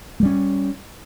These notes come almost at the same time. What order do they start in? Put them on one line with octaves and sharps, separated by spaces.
A3 G3 C#4